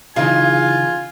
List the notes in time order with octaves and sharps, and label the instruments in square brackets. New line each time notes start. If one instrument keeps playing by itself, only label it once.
[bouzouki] C#3 [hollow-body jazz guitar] E3 D#4 G#4 [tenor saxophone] F4 [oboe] G#5